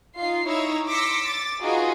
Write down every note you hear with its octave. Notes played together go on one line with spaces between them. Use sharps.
D#4 F4 C7
D#4 E4 C#5 A#5 E6
C6 D6 E6 A#6 B6 C#7
D6 A6
D#4 F4 F#4 G#4 B4